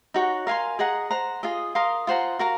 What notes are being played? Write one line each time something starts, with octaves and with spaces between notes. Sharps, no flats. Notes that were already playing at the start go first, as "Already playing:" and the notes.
D#4 F#4 C#5 F#5
A#4 F5 G#5 C6
G#4 D#5 F#5 A#5
C5 F#5 A#5
F4 G#4 D#5
A#4 F5 C6 D#6
F4 C5 F#5 A#5
F#4 A#4 F5 A#5